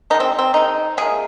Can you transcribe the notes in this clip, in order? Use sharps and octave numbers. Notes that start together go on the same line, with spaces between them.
D#3 G#3 D#4
C4
C4
D#3 G#3 D#4
C3 F3 G#3 A#3 G#4